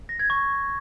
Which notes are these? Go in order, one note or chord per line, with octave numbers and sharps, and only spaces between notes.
A#6
G#6
C#6